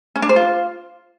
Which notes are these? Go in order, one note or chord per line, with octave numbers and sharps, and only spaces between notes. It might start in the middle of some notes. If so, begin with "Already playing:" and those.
C#4
D4
C5
F4